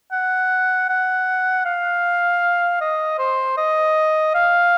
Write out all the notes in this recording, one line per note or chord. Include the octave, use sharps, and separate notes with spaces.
F#5
F#5
F5
D#5
C5
D#5
F5